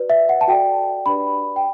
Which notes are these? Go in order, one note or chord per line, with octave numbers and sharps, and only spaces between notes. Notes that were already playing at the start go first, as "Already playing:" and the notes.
Already playing: F#4 B4 D5
E5
F#5
A5
F#4 A4 D5 G5
D4 G4 B4 D5 B5
G5